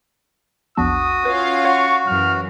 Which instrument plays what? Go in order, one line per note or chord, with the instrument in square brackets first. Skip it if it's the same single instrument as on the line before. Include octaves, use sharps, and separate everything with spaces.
[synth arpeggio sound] A#1 E2 D4 [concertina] F#4 [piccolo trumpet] D#6
[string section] C#4 F4 F5 [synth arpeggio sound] B4
[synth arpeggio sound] C#5 F#5 C6 [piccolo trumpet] C#6
[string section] F#2 E3 F#3 [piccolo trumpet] F6